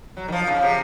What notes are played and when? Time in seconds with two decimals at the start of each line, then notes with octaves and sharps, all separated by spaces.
0.17 F#3
0.28 D#3
0.32 F3
0.47 C#3
0.62 C3